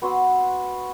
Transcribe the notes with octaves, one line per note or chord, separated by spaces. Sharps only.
B3 F#4 C6 E6